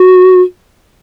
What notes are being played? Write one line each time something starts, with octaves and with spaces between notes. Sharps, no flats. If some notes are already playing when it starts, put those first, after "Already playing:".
Already playing: F#4